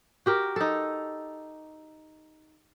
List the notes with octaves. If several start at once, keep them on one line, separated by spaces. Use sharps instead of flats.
F#4 G4 A#4
D#4 A4